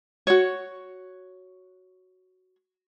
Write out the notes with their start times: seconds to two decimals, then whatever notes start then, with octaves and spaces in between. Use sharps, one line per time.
0.27 F#4 C#5